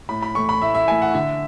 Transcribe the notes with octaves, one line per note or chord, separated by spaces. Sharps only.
A2 B5
B5
E3 A3 C#6
B5
A2 E5
E5
E3 A3 G#5
F#5
D3 E5